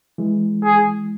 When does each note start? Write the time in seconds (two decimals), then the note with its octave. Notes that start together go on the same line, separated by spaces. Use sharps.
0.18 E3 G#3
0.64 G#4